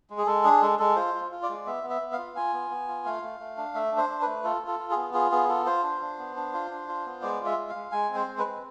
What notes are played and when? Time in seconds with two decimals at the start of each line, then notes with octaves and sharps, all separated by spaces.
0.10 G#3
0.18 G#4
0.27 G#3 A4
0.44 D4 G#4
0.62 G#3 A4
0.79 G#3 A4
0.96 F4 C5
1.14 F4
1.32 F4
1.43 D5
1.49 G#3
1.66 B3 E5
1.83 B3
1.90 E5
2.01 B3
2.12 F5
2.18 F4
2.36 F4 G#5
2.53 B3
2.70 B3
2.88 F4
3.05 A3 F5
3.22 A3
3.40 A3
3.57 D4
3.75 A3 E5
3.92 D4
3.97 C5
4.09 D4
4.22 B4
4.27 A3
4.44 F4 A4
4.62 F4
4.67 A4
4.79 F4
4.91 G#4
4.96 B3
5.13 F4 G#4
5.32 B3 G#4
5.49 F4 A4
5.66 F4 C5
5.84 D4
6.01 D4
6.18 B3
6.36 D4
6.53 F4
6.70 D4
6.88 F4
7.06 B3
7.22 G#3 D5
7.40 F4
7.46 E5
7.57 G#3
7.69 F5
7.75 G#3
7.92 G#3 G#5
8.09 C4
8.15 C5
8.27 G#3
8.38 B4
8.44 C4